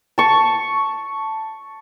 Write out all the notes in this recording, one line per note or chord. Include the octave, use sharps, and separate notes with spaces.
A5 C#6